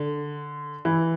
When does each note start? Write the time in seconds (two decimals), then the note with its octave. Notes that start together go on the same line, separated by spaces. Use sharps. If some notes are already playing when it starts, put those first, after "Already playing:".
Already playing: D3
0.85 E3